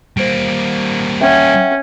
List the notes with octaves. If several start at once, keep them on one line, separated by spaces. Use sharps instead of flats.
G3 A#3 C5 D7
C#4 E5 F#5 G5